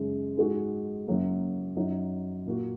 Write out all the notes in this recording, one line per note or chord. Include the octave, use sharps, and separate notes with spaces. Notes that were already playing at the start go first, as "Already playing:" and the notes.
Already playing: F#2 C#3 G#3 D#4 G#4
G#2 G#3 F#4
F#1 F#2 F#3 A#3
F#2 F#3 D#4
A#2 A#3 F#4